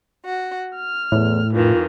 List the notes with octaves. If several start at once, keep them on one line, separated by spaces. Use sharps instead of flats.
F#4
F6
E2 A2
F2 D#3 E3 F4